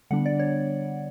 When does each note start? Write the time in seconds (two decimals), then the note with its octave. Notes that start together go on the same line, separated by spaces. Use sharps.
0.11 D3 G3 B3 D4 F#5
0.26 D5
0.40 C#5